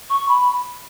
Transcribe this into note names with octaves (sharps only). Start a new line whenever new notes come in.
C#6
B5